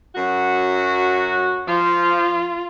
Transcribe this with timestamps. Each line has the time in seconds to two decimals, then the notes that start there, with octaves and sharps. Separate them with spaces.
0.15 F#2 F#3 F#4
1.67 F3 F4